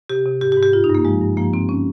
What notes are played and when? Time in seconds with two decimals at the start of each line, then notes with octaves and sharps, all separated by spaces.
0.09 C3 G4
0.26 C3
0.41 G#2 G4
0.52 G4
0.57 G#2
0.63 G4
0.73 G2 F4
0.84 D#4
0.89 G2
0.95 A#3
1.05 F3 G#3
1.21 G2
1.37 F3 A#3
1.53 F3 C4
1.69 C#4